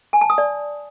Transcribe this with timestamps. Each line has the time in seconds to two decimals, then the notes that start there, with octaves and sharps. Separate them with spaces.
0.13 G#5
0.21 A5
0.30 D#6
0.38 D5